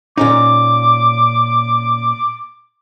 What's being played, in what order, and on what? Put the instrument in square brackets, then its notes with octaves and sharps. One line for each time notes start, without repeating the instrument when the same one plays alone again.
[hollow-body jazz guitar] A#2 C#4 D#4 [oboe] D6